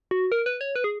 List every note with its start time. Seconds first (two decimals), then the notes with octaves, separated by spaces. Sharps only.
0.11 F#4
0.32 A#4
0.46 B4
0.61 C#5
0.76 B4
0.84 G#4